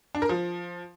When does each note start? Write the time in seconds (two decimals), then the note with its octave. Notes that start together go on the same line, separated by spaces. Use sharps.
0.15 D4
0.22 A#4
0.29 F3